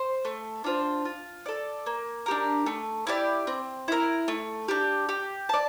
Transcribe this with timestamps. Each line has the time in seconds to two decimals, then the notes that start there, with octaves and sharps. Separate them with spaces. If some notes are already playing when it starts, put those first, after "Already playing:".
Already playing: C5
0.25 A3
0.64 D4 F4 C5
1.05 F4
1.46 A4 D5
1.86 A#3
2.26 D4 G4 A#4
2.66 A3
3.07 E4 G4 D5
3.47 C4
3.88 E4 A#4
4.28 A3
4.68 D4 G4
5.09 G4
5.49 D5 A5